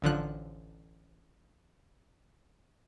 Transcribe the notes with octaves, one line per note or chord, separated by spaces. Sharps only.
A1 D3 F3 F#6